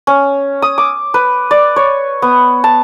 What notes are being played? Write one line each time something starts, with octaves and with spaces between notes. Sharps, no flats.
C#4
D#6
D6
B4
D5
C#5
B3
A5